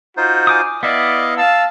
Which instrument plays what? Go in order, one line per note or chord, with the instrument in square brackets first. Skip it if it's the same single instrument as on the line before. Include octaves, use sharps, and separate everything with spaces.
[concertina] D#4 F4 C5 [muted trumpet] F#4
[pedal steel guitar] G#5 D6 D#6
[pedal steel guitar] B3 E4 [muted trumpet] D5 [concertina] D#5 F5
[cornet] F5 [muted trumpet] A5 [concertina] E6